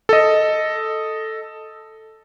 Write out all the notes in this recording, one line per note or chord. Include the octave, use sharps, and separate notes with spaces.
A4 D#5